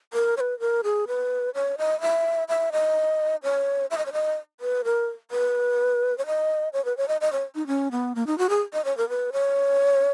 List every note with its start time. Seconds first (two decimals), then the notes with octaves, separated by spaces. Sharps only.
0.13 A#4
0.37 C#5
0.40 B4
0.60 A#4
0.84 G#4
1.08 B4
1.55 C#5
1.78 D#5
2.01 E5
2.49 E5
2.72 D#5
3.43 C#5
3.91 E5
3.98 D#5
4.06 C#5
4.13 D#5
4.60 B4
4.85 A#4
5.31 B4
6.18 C#5
6.26 D#5
6.73 C#5
6.85 B4
6.97 C#5
7.08 D#5
7.21 D#5
7.33 C#5
7.55 D#4
7.67 C#4
7.92 B3
8.15 A#3
8.27 D#4
8.38 F#4
8.49 G#4
8.73 D#5
8.85 C#5
8.97 A#4
9.09 B4
9.33 C#5